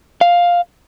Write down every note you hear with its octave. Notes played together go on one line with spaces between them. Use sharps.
F5